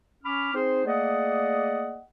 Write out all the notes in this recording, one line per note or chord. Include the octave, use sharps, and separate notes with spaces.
C#4 B5 D6 F6
C4 D#4 G#4 C5
A3 A#3 G#4 D5 D#5 F#5